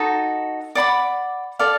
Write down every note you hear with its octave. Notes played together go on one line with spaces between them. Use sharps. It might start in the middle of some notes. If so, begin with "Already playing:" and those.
Already playing: D#4 F#4 A4
D5 F#5 B5 D6
A4 D5 F5